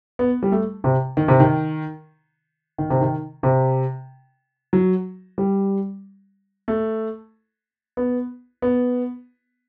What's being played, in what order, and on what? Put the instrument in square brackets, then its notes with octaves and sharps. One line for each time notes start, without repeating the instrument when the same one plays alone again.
[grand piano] B3
G3
A3
C3
D#3
C3
D#3
D#3
C3
D#3
C3
F#3
G3
A3
B3
B3